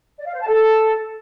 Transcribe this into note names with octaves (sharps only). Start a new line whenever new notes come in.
D5
F5
C5
A5
A4